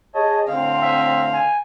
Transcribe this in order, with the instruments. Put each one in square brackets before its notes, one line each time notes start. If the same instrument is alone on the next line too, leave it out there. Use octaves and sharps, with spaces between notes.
[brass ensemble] G#4 D#5 [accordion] C#5 A5
[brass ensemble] A2 A3 C4 [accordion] D3 [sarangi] F5
[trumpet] E5
G#5